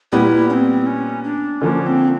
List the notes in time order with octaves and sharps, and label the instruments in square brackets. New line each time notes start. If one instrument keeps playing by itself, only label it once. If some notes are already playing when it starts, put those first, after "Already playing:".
[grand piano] A#2 G3 B3 [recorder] E4
[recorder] C#4
C4
C#4
D4
[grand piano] D3 F3 A#3 [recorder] C#4
[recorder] C4